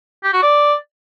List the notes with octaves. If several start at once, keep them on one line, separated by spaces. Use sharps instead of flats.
G4
F#4
D5